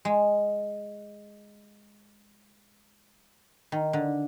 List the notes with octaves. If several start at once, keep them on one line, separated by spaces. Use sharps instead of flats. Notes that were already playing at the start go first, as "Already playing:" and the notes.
G#3
D#3
D3